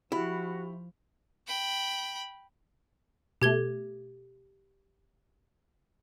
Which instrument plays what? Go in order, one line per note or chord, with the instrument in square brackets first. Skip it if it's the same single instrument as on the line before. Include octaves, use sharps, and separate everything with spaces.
[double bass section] F3 [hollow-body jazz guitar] E4 [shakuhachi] F#4 [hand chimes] G4 B5
[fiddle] G5 B5
[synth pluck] B2 A3 [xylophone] G4 G#6 G7